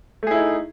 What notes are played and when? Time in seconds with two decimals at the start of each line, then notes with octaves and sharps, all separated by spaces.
0.23 A3
0.27 G#4
0.31 E4
0.35 D#4